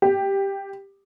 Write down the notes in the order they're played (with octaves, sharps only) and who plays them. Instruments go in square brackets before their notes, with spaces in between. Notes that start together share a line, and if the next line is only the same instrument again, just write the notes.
[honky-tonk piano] G4